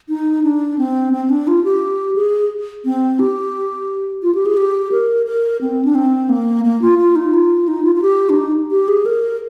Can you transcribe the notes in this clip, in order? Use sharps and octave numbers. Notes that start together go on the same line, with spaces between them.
D#4
D4
C4
C4
D4
F4
G4
G#4
C4
G4
F4
G4
G#4
G4
A#4
A#4
C4
D4
C4
A#3
A#3
F4
F4
D#4
F4
D#4
F4
F4
G4
D4
D#4
G4
G#4
A#4